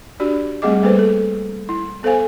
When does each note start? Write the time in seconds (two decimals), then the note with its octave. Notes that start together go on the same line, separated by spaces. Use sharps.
0.20 D4 F#4 G4 D5
0.62 G3 A3 C4 G#4 D#5 D6
0.83 G3 A#3 A4 B4 C5
0.99 A4
1.69 E4
2.03 B3 A4 C5 F5 G#5